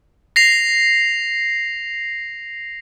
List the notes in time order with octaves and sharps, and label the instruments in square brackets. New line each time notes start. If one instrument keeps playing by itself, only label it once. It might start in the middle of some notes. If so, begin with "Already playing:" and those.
[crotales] A#6 C7 F7